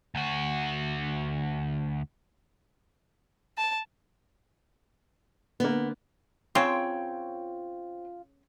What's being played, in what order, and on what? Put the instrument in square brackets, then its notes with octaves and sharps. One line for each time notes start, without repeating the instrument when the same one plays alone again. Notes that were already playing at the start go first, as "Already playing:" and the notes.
[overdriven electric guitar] D2 F#4
[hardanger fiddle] A5
[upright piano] D3 A#3 [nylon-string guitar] B3
[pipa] C#3 C#5 [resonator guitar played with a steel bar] C4 G5 [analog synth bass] F4 [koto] C5